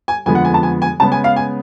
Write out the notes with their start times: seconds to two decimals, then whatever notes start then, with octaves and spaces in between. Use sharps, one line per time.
0.08 G#5
0.26 F2 D3 F3 G#3 B3 G#5
0.35 F#5
0.45 G#5
0.54 A5
0.63 G#5
0.82 G#5
1.00 C#3 G#3 B3 A5
1.12 G#5
1.24 F5
1.36 G#5